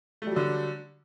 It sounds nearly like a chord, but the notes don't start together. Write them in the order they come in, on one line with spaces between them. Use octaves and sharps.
A3 G3 F#3 D3